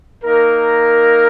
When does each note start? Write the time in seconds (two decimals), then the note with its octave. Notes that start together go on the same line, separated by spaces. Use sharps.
0.23 A#3 D#4 A#4